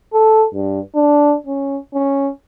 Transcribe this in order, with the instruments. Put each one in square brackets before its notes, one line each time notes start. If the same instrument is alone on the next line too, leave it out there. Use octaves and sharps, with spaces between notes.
[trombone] A4
G2
D4
C#4
C#4